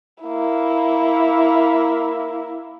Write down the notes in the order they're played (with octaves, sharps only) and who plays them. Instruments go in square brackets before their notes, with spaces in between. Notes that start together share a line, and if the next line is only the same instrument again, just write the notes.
[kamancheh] A#3 E4